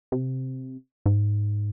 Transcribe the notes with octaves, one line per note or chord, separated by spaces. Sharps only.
C3
G#2